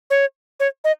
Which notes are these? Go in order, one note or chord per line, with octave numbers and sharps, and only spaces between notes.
C#5
C#5
D#5